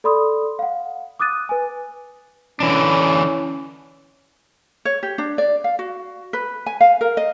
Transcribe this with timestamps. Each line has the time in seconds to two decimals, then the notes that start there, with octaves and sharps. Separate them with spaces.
0.04 A4 D5 B5 C6 D#6
0.59 F5 F#5
1.20 D6 D#6 F#6 A6 D#7
1.49 B4 G#5
2.60 D3 E3 C#4 D4
4.85 C#5
5.03 G4
5.18 D4
5.38 D5
5.64 F5
5.79 F#4
6.33 B4
6.66 G#5
6.81 F5
7.01 A#4
7.17 D#5